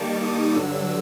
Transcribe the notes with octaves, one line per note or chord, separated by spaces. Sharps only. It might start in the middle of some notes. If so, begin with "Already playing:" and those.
Already playing: D#3 G3 A#3 D#4 A5 C#6 D6
D#6
G2 D3 F#3 E6